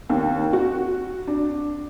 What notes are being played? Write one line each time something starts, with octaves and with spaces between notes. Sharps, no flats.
D#2
F#4
D4